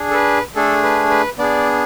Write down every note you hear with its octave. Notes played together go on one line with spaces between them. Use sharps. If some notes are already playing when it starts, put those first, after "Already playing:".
Already playing: D4 G#4
A4
B4
A3 D4 G#4 A4
B4
B4
B3 D4 G#4 D5